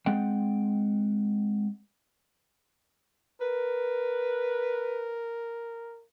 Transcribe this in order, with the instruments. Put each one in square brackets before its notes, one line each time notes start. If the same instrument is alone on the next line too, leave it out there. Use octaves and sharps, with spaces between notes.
[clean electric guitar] G#3 C4 F#5 G5
[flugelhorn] A#4 [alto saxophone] B4